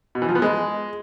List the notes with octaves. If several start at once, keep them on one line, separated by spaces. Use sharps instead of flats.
B2
E3
F3
B3
G#3